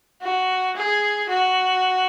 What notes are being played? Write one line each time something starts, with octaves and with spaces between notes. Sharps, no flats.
F#4
G#4
F#4